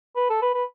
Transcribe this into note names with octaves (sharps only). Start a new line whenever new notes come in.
B4
A4
B4
B4